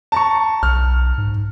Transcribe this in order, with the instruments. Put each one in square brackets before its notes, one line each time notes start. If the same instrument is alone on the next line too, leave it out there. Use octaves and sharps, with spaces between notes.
[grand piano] A5 A#5 C#6
[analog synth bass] B1 [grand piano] F6
[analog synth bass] G#2